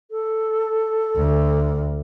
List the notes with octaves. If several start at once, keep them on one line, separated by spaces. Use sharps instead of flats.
A4
D2